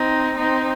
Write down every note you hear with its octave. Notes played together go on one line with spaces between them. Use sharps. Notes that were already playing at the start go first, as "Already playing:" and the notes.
Already playing: C4 D#4
C4 D#4